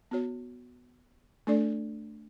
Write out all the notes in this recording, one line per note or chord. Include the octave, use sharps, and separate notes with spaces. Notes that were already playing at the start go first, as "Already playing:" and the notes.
B3 F#4 C#5
A3 D4 A4 D5